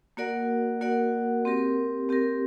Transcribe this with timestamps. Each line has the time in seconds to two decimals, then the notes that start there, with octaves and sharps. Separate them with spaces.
0.17 A#3 F#4 A#4 D5 F#5
0.81 A#3 F#4 A#4 D5 F#5
1.45 C4 G4 A#4
2.09 C4 G4 A#4